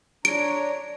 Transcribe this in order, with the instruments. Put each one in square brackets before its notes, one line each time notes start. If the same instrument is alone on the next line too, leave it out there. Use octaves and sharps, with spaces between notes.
[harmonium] D4 C#5 A#5 [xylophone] D7